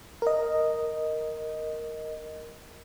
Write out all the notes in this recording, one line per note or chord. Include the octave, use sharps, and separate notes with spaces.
A#4 D#5